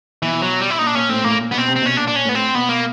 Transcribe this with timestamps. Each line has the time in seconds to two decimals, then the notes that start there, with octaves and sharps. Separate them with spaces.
0.22 B2 E3
0.42 F#3
0.61 G3
0.70 E4
0.79 A#2 D#4
0.87 D4
0.94 A#2 C#4
1.09 A2 C4
1.24 A2 A#3
1.38 A#2
1.52 B2 B3
1.58 C4
1.67 C3
1.76 C4
1.82 B2 C#4
1.97 A#2 D4
2.08 D4
2.16 C#4
2.25 A2 B3
2.35 C4
2.54 B2 B3
2.69 A#3